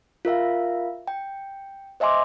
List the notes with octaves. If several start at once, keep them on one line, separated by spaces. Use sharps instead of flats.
F4 A#4 E5 F5
G5
C5 D#5 E5 G#5 C6 D6